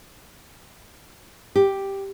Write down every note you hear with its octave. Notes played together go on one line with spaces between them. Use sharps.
G4